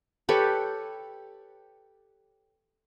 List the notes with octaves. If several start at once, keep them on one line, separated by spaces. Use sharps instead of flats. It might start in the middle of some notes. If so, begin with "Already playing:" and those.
G4 A4 B4 C#5